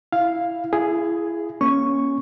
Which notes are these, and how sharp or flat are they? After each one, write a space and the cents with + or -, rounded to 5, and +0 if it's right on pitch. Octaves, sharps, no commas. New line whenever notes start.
E4 +0 F5 +0
E4 +25 G#4 +0
A#3 +35 C#4 +0 C#6 +0